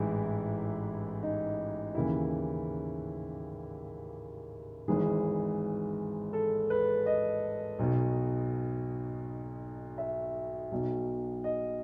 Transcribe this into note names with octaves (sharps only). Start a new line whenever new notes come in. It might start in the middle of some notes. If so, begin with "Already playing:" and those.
Already playing: A1 G#2 E3 E4 G#4
D#4
D#2 C#3 E3 E4
G#1 G#2 E3 G#4
A4
B4
D#5
B1 B2
E5
B1 B2
D#5